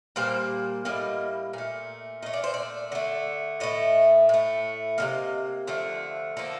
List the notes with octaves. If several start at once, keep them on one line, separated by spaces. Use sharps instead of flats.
A#2 G3 A#3 C5
A2 G3 A#3 D#5
A#2 A3
A#2 A3 D#5
D5
C5
D5
D3 A3
A2 A3 D#5
A2 A3
C3 F3 A#3 D#5
D3 F3 A3
D3 F3 A#3 A4